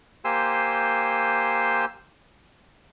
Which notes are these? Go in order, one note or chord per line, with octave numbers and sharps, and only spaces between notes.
A#3 G4 C5 G#5 C6 E6